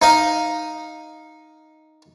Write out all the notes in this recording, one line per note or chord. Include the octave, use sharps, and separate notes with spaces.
D#4 D#5 F5